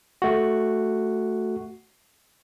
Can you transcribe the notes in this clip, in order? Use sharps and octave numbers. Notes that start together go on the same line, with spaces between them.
A3 F#4